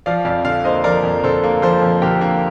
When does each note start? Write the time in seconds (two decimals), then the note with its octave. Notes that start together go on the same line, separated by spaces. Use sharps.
0.06 F3 D5 F5
0.25 F2 D5 F5
0.45 D3 D5 F5
0.64 A#3 C5 D#5
0.84 F3 A#4 D5
1.03 F2
1.24 D3 A4 C5
1.44 A#3
1.62 F3 A4 C5
1.82 F2
2.02 D3 G4 A#4
2.21 A#3